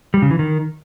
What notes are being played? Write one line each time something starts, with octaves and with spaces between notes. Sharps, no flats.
G3
C#3
E3
D#3